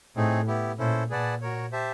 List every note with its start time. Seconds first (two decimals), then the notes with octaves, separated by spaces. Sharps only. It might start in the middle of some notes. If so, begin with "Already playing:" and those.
0.16 A2 A3 C4 D#4 G#4
0.47 B3 E4 G4
0.78 A#2 C#4 E4 A4 C5
1.10 A#2 G#4 B4 D5 F#5 A5
1.41 F#4 A#4 C#5
1.72 G4 C5 E5 A5